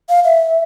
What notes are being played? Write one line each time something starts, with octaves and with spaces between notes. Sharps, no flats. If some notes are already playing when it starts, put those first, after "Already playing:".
F5
E5